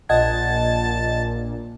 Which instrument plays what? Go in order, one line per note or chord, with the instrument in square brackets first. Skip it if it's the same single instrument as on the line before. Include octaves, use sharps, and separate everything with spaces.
[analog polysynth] A#1 A#2 [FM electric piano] D#5 F#5 G#6 [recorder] A5